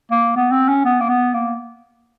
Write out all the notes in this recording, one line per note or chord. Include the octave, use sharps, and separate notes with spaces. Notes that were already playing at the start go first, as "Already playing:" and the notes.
A#3
B3
C4
C#4
B3
A#3
B3
A#3